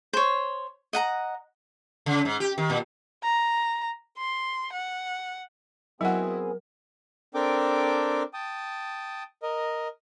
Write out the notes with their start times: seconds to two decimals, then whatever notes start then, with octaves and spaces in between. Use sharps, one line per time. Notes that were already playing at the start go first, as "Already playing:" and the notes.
0.13 C5 C#5
0.93 D#5 F#5 A#5
2.06 C#3
2.25 G#2
2.40 G4
2.58 D#3
2.70 A#2
3.23 A#5
4.18 C6
4.73 F#5
6.01 F#3 B3 C4 E4 F#4 G#4 A#4 F#5
7.34 C4 D4 A4 A#4 G5 D6
8.34 G5 A5 D#6
9.43 A#4 D#5